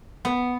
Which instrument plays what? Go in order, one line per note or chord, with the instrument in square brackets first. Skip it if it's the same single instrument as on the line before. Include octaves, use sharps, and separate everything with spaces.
[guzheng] B3